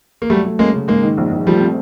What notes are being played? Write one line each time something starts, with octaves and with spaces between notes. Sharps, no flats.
A#3
F#3 G3 A3
A3
G#3 A#3 C#4
C#3
G#2 G#3 A#3
D#3
A#1
A#1
F3 G3 A3
C4